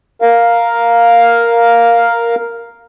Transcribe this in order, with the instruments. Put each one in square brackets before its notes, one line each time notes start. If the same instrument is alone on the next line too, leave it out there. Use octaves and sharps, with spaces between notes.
[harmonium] A#4 F5